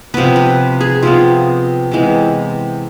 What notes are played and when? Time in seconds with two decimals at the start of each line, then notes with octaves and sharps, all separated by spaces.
0.14 C3 F3 B3 B4
0.36 B4
0.81 G#4
1.03 C3 F3 B3 F4
1.92 C3 E3 G#3 B3